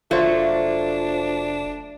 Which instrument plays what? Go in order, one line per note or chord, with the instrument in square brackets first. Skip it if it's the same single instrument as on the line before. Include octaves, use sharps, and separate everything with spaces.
[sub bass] F1 [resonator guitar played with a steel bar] F#3 A3 A#3 [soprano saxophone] D4 [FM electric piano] F4 C5